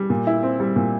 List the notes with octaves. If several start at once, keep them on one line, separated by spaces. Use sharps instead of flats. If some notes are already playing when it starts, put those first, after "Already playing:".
Already playing: G3
A#2
E4
C4
G3
A#2